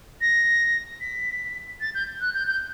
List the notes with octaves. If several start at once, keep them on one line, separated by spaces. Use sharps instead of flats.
A#6
B6
A6
G6
F#6
G6
G6